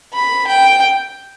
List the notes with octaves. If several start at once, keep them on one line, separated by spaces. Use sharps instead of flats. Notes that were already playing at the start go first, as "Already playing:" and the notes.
B5
G5